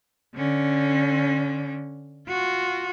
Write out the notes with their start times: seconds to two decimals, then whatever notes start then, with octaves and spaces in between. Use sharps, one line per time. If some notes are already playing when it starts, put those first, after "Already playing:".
0.36 D3 C#4
2.29 F4 F#4